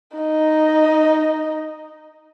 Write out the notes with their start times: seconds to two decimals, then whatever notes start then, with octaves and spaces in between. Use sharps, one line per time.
0.17 D#4 D#5